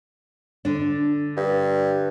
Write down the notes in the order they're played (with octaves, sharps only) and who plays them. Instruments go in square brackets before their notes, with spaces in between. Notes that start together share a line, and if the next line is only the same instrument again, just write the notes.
[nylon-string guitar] D3 D4
[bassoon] G2